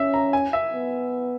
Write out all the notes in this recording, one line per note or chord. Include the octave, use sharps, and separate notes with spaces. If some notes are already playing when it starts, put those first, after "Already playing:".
Already playing: C#4 E5
A#5
G#5
E5
B3